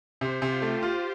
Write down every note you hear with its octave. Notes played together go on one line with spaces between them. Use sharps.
C3 C5
C3
F4
A3 G4
F4